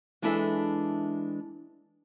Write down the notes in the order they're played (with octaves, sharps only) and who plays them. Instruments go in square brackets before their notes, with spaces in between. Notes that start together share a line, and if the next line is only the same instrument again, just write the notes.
[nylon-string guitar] E3 G#3 D4 E4 A4 E5